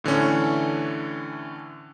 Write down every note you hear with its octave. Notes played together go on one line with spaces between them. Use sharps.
A2 D3 E3 C#4